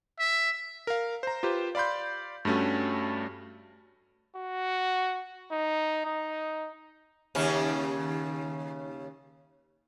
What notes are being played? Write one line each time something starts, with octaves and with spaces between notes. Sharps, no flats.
E5
A#4 F5
C5 A#5
F4 G4 B4 C5
D5 F5 B5 C6 G6
G2 G3 A3 C#4 F#4
F#4
D#4
D#4
D#2 C#3 C#4